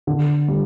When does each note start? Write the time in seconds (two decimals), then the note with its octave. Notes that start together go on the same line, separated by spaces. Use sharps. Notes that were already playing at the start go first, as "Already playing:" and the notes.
0.07 D3
0.48 G3